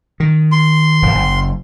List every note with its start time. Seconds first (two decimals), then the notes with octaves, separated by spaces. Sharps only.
0.20 D#3
0.52 C6
1.02 D1 G1
1.15 F#1